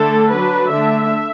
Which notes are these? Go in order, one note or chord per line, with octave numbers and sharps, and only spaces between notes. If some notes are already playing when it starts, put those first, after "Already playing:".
Already playing: D3 A3 D4 A4
F#3 D4 B4
D3 A3 D4 E5